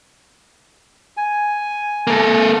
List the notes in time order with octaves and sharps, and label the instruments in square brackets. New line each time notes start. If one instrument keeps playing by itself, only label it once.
[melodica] G#5
[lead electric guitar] A#3 A4